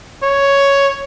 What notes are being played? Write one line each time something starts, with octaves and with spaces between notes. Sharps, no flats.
C#5